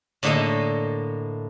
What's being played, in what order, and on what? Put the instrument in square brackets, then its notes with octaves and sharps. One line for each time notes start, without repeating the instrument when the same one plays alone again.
[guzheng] A2 D3 A#3 D#4 A4 D#5